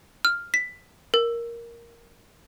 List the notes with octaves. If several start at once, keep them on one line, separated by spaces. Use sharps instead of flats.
F6
B6
A#4